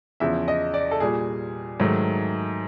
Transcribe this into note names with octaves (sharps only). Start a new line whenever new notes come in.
E2 C#3 F3 E5
D#5
D5
A4
A#2 G3 G#4
G#2 D#3 F#3 A3